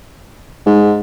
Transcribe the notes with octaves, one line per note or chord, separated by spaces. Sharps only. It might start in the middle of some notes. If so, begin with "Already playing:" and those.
G#2